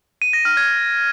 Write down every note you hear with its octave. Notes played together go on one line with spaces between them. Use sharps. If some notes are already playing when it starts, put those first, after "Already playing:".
D#7
A#6
F6
G#6